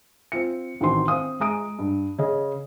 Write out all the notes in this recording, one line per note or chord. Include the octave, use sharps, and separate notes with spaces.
C4 F4 C#7
A1 D#3 C4 F#4 C6
C4 F5 D#6
G#3 A#5 D#6 D7
G2
C#3 G#4 D#5